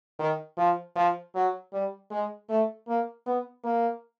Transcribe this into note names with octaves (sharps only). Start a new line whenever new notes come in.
D#3
F3
F3
F#3
G3
G#3
A3
A#3
B3
A#3